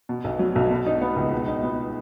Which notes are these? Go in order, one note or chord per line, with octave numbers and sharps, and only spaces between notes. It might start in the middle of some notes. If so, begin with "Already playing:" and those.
B2
B1
F#3
B1
B2
D#4
B3
C#2
B2
D#4
B3